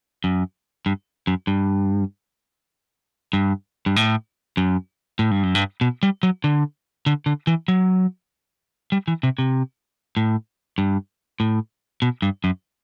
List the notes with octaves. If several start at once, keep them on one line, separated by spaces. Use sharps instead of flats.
F#2
G2
F#2
G2
G2
G2
A2
F#2
A2
G2
F#2
G2
B2
G3
F#3
D3
D3
D3
E3
F#3
G3
E3
C3
C3
A2
G2
A2
B2
G2
F#2